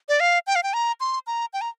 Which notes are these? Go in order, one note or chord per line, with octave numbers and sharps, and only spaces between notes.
D5
F5
G5
F5
G5
A#5
C6
A#5
G5
A#5